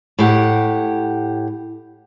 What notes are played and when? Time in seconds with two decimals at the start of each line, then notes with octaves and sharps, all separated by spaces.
0.19 A2 G4 F#5